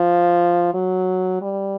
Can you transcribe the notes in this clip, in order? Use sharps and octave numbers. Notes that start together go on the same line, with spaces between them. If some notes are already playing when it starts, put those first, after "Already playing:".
Already playing: F3
F#3
G3